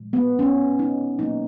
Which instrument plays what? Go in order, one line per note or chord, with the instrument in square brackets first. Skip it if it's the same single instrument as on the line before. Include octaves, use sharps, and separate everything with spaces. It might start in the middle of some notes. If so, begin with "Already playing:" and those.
Already playing: [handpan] A#2 F3 G#3
B3
C#4
D#4
B2 F#3 A#3 D#4